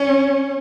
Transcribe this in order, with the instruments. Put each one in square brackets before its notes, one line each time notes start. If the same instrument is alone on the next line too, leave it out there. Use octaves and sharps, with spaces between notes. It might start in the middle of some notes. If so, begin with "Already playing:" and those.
Already playing: [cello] C#4